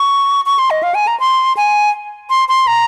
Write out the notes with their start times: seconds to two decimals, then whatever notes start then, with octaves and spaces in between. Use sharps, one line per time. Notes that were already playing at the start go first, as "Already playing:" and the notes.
Already playing: C#6
0.46 C#6
0.59 C6
0.71 D#5
0.83 F5
0.95 G#5
1.07 A#5
1.20 C6
1.57 G#5
2.30 C6
2.49 C6
2.67 A#5